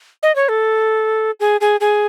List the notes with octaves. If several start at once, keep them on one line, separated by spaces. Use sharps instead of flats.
D#5
C#5
A4
G#4
G#4
G#4